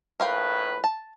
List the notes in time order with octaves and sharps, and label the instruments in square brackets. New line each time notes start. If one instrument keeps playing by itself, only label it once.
[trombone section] A#1 A2 B4 [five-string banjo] A#4 F5 G5
[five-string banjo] A5